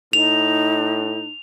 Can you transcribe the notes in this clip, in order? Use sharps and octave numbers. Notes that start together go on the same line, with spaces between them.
A2 D#4 F7